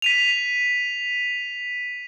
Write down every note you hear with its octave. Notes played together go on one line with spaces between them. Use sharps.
B6 D#7 F7